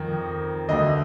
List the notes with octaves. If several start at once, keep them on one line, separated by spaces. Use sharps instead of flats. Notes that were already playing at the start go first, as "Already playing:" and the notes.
Already playing: F2 D#3
D2 D3 D#5